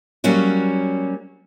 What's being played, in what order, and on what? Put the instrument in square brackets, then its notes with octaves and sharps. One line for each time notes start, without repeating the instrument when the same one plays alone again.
[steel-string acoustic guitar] F#3 G3 A#3 C#4 F#4